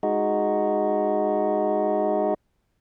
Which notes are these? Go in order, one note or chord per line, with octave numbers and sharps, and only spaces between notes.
G#3 D#4 F#4